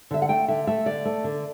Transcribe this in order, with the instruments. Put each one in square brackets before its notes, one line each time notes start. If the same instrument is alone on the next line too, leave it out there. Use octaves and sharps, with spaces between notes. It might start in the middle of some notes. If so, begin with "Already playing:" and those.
[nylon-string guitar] D3 E5
F#5
A3 G5
D3 E5
A3 E5
D3 D5
A3
D3